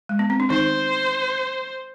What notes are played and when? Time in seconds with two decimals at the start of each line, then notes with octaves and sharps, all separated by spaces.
0.09 G#3
0.19 B3
0.30 C4
0.40 D4
0.50 D#3 D#4 C5